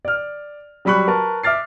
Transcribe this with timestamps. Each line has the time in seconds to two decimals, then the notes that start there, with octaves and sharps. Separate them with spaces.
0.05 D5 F6
0.85 F#3 G3 G4 B5 C#6 F#6
1.07 A#4 B4 A5 C#6
1.43 E5 D6 F6 A6 C7